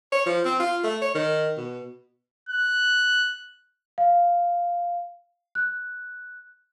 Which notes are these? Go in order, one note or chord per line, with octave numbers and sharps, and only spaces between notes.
C#5
F3
C4
F4
A3
C#5
D#3
B2
F#6
F5
F#6